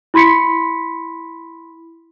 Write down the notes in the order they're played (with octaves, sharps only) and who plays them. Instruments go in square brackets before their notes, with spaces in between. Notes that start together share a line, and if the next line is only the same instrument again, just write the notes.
[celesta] E4 B5 C6 B6 C#7